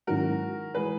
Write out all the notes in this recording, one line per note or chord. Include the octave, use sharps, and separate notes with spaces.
G#2 D#3 F#3 C#4 E4 F#4 A#4
E3 G#3 G#4 B4